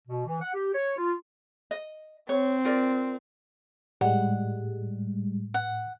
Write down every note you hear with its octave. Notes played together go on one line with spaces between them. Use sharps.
B2
E3
F#5
G4
C#5
F4
D#5
C4 C#5
F4 A#4 D5
A2 G3 G#3 F#5
F#5